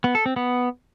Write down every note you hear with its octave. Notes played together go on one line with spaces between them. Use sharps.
B3
A4
C4
B3